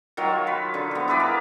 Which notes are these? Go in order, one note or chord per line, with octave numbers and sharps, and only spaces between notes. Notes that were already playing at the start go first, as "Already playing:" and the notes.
D#3 F#3 F4 C#5
B4
D3
F3 B3
E4 G#4 B4 D5
A#4